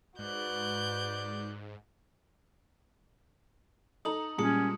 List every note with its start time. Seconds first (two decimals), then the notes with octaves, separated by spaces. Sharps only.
0.19 G#2 F#4 B4 D5 F#6 G6
4.05 D#4 A4 A#5 D#6 F#7
4.38 A#2 G3 G#3 C#4 A5 D#6 C#7 F#7